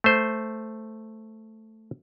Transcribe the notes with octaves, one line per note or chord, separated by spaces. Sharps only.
A3 C5